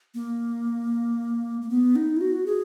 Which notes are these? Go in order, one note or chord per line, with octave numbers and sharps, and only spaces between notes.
A#3
A#3
B3
D#4
E4
F#4
G#4